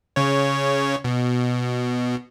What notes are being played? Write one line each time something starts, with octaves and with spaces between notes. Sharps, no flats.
C#3 C#5
B2